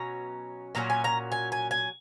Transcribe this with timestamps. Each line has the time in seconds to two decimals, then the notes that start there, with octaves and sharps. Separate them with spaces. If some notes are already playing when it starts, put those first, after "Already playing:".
Already playing: B2 F#3 C#4 A#5
0.75 A#2 F#3 C#4 A#5
0.90 G#5
1.04 A#5
1.32 G#5
1.52 G#5
1.71 G#5